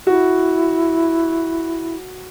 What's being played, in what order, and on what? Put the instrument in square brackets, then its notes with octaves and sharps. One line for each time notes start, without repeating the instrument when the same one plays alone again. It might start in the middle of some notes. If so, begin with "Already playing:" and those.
[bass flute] E4 [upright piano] F#4